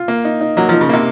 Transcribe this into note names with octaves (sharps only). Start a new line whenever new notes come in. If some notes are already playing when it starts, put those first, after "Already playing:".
Already playing: F4
A#3
D#4
D#4
F#3 A#3
F3 D#4
C#3
C3 A#3